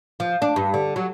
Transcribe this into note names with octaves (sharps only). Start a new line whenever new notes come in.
F3
D4
G2
D3
F#3